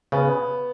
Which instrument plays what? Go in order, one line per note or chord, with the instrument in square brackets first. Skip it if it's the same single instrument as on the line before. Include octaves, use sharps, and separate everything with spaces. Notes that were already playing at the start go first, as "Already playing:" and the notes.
[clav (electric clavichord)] C#3 [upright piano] B3